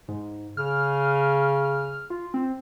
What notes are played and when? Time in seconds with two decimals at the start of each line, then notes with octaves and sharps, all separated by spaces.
0.08 G#2
0.57 C#3 F6
2.10 F4
2.34 C4